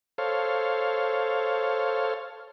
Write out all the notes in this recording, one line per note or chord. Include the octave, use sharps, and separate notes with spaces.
A4 C5 C#5 F5